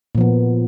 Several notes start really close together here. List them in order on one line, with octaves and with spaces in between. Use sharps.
A#2 F3 B3